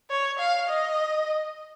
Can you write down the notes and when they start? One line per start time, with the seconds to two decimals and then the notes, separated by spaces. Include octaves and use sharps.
0.10 C#5
0.39 F5
0.68 D#5